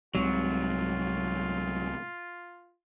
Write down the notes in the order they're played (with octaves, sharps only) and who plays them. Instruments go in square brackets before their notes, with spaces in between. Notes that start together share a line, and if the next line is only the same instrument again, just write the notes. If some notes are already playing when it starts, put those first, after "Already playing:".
[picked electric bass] C2 G#2 C3 [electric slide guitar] F#3 [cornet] F4